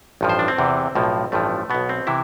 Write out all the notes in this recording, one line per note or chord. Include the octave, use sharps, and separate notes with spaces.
A1 G2 F3
C5
D4
C4
E2 C3 E3
B1 A2 F3
A1 G2 F3 A3
B1 B2 B3
C4
C3 E3 E4